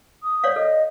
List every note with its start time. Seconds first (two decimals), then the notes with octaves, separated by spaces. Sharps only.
0.22 D#6
0.44 C#5 D5 F5
0.56 A4 D#5